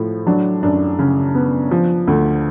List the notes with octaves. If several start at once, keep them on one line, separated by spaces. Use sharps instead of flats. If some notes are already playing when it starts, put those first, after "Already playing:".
Already playing: A2 F3
F#3 D4
F#2 D4
C#3
B3
F3
D2